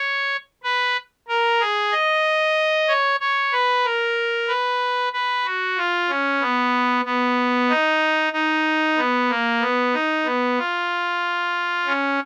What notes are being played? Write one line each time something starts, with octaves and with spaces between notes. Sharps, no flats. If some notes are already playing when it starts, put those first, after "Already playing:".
Already playing: C#5
B4
A#4
G#4
D#5
C#5
C#5
B4
A#4
B4
B4
F#4
F4
C#4
B3
B3
D#4
D#4
B3
A#3
B3
D#4
B3
F4
C#4